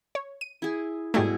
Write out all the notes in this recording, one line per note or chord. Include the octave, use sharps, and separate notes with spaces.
C#5
D#7
E4 G#4
G#2 B2 G3 A3 E4 G#4